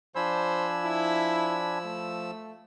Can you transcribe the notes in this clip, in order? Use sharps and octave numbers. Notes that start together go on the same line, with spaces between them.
F3 D4 C5 G#5 B5 E6
E4
A3